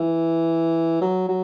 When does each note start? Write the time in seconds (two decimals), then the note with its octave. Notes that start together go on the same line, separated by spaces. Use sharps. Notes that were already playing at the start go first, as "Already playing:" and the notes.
Already playing: E3
1.01 F#3
1.28 F#3